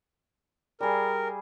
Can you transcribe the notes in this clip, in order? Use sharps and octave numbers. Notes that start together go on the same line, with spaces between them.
G3 G#4 A#4